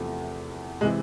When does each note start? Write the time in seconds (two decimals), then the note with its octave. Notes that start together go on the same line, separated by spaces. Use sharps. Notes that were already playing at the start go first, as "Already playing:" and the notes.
Already playing: E2 C3 F3 A3
0.81 C3 E3 G#3